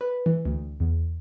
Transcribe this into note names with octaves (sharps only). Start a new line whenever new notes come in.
B4
E3
D2
E2